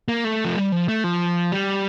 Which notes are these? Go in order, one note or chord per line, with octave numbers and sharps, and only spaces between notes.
A#3
A3
F3
G3
F3
A3
F3
G3